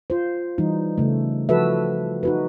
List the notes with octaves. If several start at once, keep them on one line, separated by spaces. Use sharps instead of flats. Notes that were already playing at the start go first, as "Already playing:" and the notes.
F4 C5
E3 G3 D#4
C#3 A3
F3 F#4 A4 B4 E5
D#4 F#4 B4